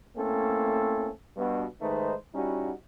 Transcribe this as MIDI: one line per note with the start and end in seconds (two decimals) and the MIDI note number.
0.17 1.11 57
0.17 1.11 58
0.17 1.11 60
0.17 1.11 61
0.17 1.11 64
0.17 1.11 69
1.37 1.65 43
1.37 1.65 47
1.82 2.14 44
1.82 2.14 51
1.82 2.14 57
1.82 2.14 63
1.82 2.14 71
1.82 2.14 72
2.35 2.72 55
2.35 2.72 61
2.35 2.72 63
2.35 2.72 64
2.35 2.72 66